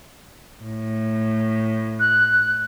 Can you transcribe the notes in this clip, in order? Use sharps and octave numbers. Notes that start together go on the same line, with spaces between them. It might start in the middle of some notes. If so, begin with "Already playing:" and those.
A2
F#6